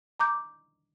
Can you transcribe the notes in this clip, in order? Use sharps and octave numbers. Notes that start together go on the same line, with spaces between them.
A#5 D6 G6